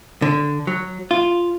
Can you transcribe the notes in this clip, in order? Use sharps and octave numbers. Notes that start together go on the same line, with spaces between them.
D3
F#3
F4